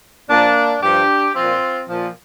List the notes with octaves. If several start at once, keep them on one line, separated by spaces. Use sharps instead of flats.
A#2 F3 A#3 D4
G2 F3 D4 G4
A#2 F3 C4 F4
A#2 F3